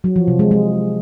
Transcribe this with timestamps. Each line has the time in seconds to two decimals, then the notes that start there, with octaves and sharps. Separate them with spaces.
0.04 F#3
0.16 F3
0.28 C3
0.39 G#3
0.51 G#3